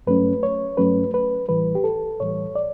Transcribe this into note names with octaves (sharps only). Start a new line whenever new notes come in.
G2 F#3 A3 C#4 B4
C#5
G2 F#3 A3 C#4 B4
B4
A2 E3 G3 B4
G4
A4
A2 E3 G3 C#5
D5